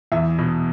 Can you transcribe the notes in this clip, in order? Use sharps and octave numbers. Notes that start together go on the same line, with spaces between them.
E2 E5
B2